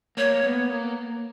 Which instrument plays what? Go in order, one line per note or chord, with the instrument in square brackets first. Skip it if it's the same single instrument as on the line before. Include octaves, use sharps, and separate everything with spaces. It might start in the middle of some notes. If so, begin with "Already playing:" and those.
[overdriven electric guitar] A#3 [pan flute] C#5
[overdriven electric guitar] B3
A#3